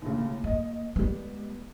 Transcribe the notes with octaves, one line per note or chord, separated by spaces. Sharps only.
D#2 A2 C#3
A#3 D#5
G3 G#3 B3